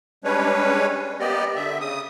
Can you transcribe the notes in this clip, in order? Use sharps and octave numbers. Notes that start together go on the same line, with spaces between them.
G3 G#3 C#4 D4 B4 C#5
A#3 B3 G4 D5 D#5
D3 E5
C#3 D#6